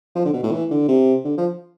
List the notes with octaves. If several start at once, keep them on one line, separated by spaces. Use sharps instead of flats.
F3
D3
B2
A2
E3
D3
C3
D3
F3